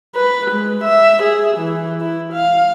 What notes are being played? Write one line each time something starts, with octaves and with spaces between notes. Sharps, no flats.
B4
G#3
E5
G#4
E3
E4
F5